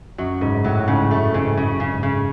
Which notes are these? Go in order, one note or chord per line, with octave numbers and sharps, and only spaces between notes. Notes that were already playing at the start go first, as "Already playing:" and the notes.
F#2 F#3
G#2 C#3
A2 F#3
G#2 C#3
F#2 A3
G#2 C#3
F#2 C#3
C#3
G#2
C#3